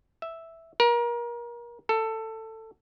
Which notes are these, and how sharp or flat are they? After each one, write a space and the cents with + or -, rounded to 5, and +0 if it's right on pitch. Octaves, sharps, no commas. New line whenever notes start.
E5 -5
A#4 +30
A4 +15